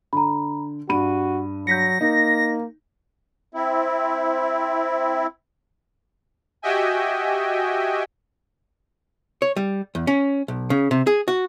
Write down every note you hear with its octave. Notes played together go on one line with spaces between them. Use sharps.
D3 A#5 B5
G2 F#4 B5 D#7
F#3 G6 A#6 B6 C#7
A#3 D#4
C4 E4
F#4 G4 D#5 E5 G5 G#5
C#5
G3
E2
C#4
B1
C#3
C3
G#4
F#4